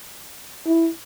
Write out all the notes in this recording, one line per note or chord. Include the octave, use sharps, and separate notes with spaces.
E4